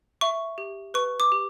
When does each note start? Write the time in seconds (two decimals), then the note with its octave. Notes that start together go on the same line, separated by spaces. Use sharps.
0.21 E5 C#6
0.58 G4
0.94 B4 C#6
1.20 D6
1.32 G4